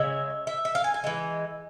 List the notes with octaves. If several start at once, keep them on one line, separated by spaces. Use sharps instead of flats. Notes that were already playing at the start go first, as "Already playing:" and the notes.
Already playing: C#3 G#3 E5
E5
E5
F5
G#5
G#5
E3 G#3